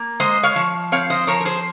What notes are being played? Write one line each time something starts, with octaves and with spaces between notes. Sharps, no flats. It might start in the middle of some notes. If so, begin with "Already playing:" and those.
Already playing: A#3
G#3 C5 D#5
C#5 F5
F3
C4 C#5 F5
C5 D#5
F3 A#4 C#5
A#4
G#4 C5